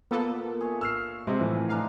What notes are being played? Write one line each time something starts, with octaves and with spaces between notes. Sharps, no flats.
A#2 A#3 B3 A4
G#4 C#5 E5
E6 F6 C7
C3 G#3 C5
A2 E3 F3
D4 D#4 D#5 F5